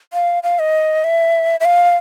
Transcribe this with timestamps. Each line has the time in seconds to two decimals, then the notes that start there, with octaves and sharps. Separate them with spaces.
0.13 F5
0.43 F5
0.59 D#5
1.04 E5
1.60 E5
1.65 F5